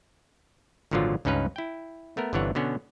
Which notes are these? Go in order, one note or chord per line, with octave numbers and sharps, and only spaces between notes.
G#1 A#2 D3 F3 F#3 F4
C#2 G2 C#4 D#4 B4 F5
E4 G5
A3 B3 A#4
G1 C3 E3 D4 C#5 F#5
B2 D3 B3 C#4